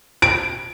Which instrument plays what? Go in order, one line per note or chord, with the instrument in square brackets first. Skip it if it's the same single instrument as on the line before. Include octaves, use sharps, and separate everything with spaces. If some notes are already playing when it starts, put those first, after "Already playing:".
[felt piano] D7